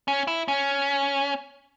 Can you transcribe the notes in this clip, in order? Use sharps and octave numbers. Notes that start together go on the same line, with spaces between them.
C#4
E4
C#4